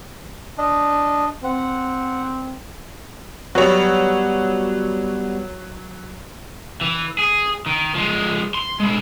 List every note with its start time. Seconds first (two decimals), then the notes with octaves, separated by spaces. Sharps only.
0.58 D4 D#5
1.44 C4 F#5
3.55 F#3 G3 B3 F#4 C#5
6.81 E3
7.19 G#4
7.66 D#3
7.95 F3 G#3
8.55 C6
8.80 G#3 E4